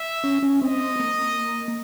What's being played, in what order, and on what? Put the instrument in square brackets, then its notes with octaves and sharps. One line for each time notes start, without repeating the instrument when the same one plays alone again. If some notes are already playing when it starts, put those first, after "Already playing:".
Already playing: [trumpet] E5
[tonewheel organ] C#4
C#4
[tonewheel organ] C4 [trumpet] D#5
[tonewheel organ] A#3